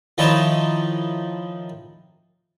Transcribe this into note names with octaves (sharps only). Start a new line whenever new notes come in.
D#3 F3 D#4 E4 C#5 A5